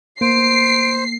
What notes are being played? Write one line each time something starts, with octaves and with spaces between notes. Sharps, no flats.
A#3 C5 C7 D7